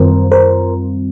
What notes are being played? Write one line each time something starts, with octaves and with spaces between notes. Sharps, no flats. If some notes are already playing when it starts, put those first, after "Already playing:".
Already playing: F#2 D#3 G3 C4 F4 A#4 C5
A#4 C5